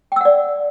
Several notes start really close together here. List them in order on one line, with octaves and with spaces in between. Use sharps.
G5 E6 F#5 D5